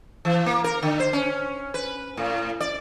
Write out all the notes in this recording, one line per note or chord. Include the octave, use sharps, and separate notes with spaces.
E3
A#3
A#4
D3
C5
C#4
B4
A2
D5